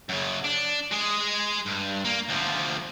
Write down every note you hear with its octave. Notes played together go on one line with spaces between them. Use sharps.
F#2 C#3
D4
G#3 G#4
G2
A#3
D2 F3